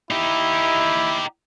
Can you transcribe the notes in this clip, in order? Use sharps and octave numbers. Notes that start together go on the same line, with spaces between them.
D#4 E4 G4